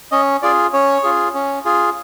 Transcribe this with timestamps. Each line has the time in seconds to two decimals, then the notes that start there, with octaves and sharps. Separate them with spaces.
0.12 C#4 D#5
0.42 F4 G#4 D5
0.73 C#4 C#5
1.03 F4 G#4
1.35 C#4
1.65 F4 G#4